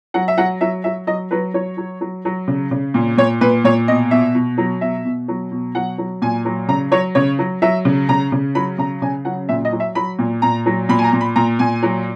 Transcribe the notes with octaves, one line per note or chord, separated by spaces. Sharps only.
F#3 F#5
E5
F#3 F#5
F#3 E5
F#3 E5
F#3 D#5
F#3 B4
F#3 C#5
F#3
F#3
F#3
C#3
C#3
A#2
A#2 C#5
A#2 B4
A#2 C#5
B2 D#5
B2 E5
B2
F#3
B2 E5
B2
F#3
B2
F#3 F#5
F#3
A#2 G#5
F#3
C#3 A#5
F#3 C#5
C#3 C#5
F#3
F#3 E5
C#3
C#3 A#5
C#3
F#3 B5
C#3 A#5
C#3 G#5
F#3 F#5
A#2 E5
D#5
F#3
E5
F#3 B5
A#2
A#2 A#5
F#3
A#2 B5
G#5
A#5
A#2
B5
A#2 A#5
A#2 G#5
F#3